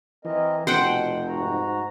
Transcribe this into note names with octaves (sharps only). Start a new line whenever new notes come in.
E3 C4 A#4 D#5
F1 B2 C5 F#5 G5
G#2 F#4 A#5